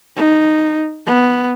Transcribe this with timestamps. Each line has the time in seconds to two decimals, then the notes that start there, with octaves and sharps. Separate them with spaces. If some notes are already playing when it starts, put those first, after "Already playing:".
0.16 D#4
1.06 B3